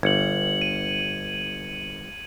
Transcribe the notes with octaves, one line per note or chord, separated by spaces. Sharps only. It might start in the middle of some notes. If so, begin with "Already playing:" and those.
G1 G#6 C#7 F#7
D#7